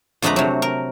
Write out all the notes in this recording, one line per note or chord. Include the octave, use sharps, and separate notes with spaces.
F2 D3 G#3 A3 B4 A#5
C3 F#3
A#4